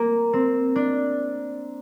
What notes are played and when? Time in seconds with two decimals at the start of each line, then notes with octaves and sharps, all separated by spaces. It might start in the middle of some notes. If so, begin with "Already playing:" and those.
Already playing: A#3
0.33 C4
0.76 D4